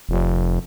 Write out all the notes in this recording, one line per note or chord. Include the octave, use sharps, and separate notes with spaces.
F1